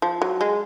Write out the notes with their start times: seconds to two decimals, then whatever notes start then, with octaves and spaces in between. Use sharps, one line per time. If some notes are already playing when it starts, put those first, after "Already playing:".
0.02 F3
0.22 F#3
0.41 G#3